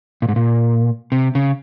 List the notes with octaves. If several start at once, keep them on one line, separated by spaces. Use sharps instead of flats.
A#2
G#2
A#2
C3
C#3